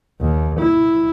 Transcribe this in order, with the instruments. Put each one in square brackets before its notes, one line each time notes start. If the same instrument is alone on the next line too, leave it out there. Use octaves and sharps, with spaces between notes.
[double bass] D#2
E4